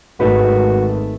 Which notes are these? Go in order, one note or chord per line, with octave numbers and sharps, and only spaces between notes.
G#1 A3 D#4 F#4 B4